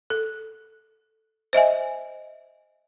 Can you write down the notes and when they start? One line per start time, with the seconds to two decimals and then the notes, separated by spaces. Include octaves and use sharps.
0.10 A4
1.53 C5 D#5 E5 G#5